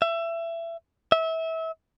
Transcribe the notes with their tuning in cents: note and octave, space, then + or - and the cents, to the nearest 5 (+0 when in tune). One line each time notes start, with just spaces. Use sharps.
E5 +25
E5 -25